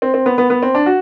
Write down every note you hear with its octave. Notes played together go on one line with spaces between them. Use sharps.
C4
C4
B3
B3
B3
C4
D4
F#4